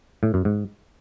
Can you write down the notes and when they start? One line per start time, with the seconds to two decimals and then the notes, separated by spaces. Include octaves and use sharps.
0.23 A2
0.34 F#2
0.45 G#2